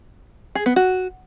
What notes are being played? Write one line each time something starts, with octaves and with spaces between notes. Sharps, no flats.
G#4
B3
F#4